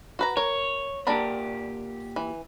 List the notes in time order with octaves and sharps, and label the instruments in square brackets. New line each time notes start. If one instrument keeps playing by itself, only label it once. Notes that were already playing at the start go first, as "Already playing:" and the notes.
[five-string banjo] F#4 B4 A#5
[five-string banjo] A#4 [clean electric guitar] C#5
[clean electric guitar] A#2 G4 [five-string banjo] D4 A#4 B5
[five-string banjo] E3